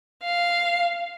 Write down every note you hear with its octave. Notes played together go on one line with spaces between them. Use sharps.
F5